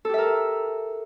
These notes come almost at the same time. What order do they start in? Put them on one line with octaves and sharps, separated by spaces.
A4 G4 E5 A#4